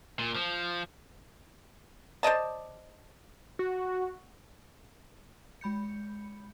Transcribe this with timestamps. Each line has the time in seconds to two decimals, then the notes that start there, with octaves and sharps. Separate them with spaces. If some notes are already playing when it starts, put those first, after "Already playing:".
0.19 A#2
0.36 F3
2.23 C5 D5 D#5 A5
3.59 F#4
5.61 G#3 B5 G6 C#7